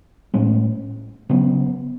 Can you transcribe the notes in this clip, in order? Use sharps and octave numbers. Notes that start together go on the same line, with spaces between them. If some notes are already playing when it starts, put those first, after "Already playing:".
A2 G#3 C#4
C#3 F#3 B3